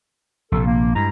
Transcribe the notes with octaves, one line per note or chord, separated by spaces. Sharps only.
A#1 C3 A4
A#3
G2 G#3 E4 A#5